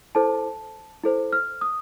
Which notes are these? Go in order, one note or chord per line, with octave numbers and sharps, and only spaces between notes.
E4 A4 C5 A5
E4 A4 C5
F6
D#6